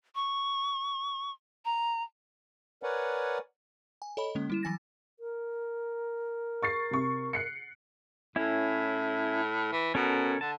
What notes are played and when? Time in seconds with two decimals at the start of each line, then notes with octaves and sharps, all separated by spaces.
0.15 C#6
1.65 A#5
2.83 A#4 B4 C#5 D5 F#5 G#5
4.02 G#5
4.17 A4 C#5 D#5 B5
4.35 D3 G#3 A#3 C#4
4.50 G3 E4 E7
4.63 E3 F#3 G#5 A6 A#6
5.20 A#4
6.62 C#6 A6 C7
6.91 C3 C#6
7.33 F#6 C7 C#7
8.36 A2 C#4 E4
9.72 E3
9.95 B2 C#4 A4 A#4
10.41 D3 A5